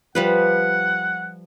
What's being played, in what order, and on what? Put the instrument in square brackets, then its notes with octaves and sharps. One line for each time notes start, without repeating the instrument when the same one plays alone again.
[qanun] F3 G3 B4 [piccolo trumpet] F#5